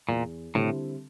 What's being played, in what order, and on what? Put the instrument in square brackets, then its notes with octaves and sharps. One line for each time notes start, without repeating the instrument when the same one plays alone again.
[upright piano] E2 [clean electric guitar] A#2
[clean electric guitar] A2 [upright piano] D3 G3 C4 E4